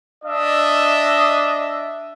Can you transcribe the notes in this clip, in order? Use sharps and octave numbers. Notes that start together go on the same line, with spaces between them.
D4 D#5 E5